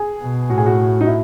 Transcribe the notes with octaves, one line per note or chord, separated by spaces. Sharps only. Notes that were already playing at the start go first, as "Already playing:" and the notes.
Already playing: G#4
B2
A2 F#4
G#4
F#4
D#4
E4